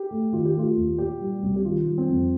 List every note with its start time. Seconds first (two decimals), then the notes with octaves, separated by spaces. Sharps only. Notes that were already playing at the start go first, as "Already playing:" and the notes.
Already playing: G4
0.11 A3
0.33 D#3 F4
0.45 G4
0.55 A3 F4
0.77 D#2
0.98 A#2 G4
1.20 G3
1.43 C2
1.56 G4
1.64 D#3 F4
1.87 G3
1.98 C4
2.09 F2